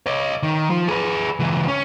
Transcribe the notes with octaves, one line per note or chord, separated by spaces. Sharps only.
C#5 D#5
D#3
F3
G#4 B4
C#2 E3
C#4